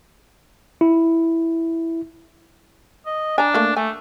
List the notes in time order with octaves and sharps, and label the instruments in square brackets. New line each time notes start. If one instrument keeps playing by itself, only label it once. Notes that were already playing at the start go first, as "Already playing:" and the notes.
[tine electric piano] E4
[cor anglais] D#5
[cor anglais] D4 [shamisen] G#5 A#5
[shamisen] A3 A#3 A4
[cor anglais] A3 [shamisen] G#5